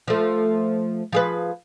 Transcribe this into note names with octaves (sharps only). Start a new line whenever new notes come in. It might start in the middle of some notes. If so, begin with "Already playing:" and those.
F3 A3
F3 G#4 B4